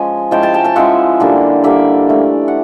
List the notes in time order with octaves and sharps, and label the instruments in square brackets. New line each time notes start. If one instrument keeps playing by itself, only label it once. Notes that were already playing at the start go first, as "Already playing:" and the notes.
Already playing: [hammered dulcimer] F3 G#3 C#4 G#5
F3 G#3 C#4 E4 G5 A5
G5 A5
G5 A5
G5 A5
F3 G#3 C#4 E4 E5 F#5
D3 G3 A#3 D4
D3 G3 A#3 D4 D5 E5
E3 A3 D4
F#5